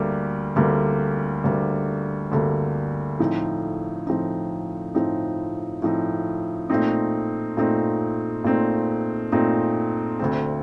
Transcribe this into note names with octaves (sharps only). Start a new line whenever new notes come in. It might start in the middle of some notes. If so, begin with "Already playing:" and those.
Already playing: D2 D3 G3 A#3
D2 D3 G3 A#3
D2 D3 G3 A#3
D2 D3 G3 A#3
A2 F3 C4 D#4
A2 F3 C4 D#4
A2 F3 C4 D#4
A2 F3 C4 D#4
A#2 A3 C4 D#4
A#2 A3 C4 D#4
A#2 A3 C4 D#4
A#2 A3 C4 D#4
D2 D3 A3 C4